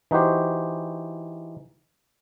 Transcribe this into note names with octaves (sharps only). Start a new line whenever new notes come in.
E3 D#4 F#4 G4 C5